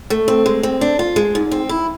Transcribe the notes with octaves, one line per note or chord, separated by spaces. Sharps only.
A3
C4
G#3
C4
D4
F4
G#3
G#2
C4
E4